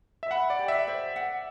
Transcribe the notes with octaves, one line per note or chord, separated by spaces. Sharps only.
E5
F#5 B5
D5
G4
E5
C5
F#5